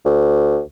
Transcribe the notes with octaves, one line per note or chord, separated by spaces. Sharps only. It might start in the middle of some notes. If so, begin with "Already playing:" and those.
D2